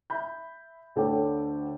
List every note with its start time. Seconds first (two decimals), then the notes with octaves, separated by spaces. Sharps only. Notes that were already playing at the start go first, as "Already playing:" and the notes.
0.10 E5 B5 G6
0.96 D2 D3 A4 C#5 G5 D6